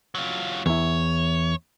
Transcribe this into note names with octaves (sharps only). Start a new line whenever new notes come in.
F#3 F4
E2 E4 C#5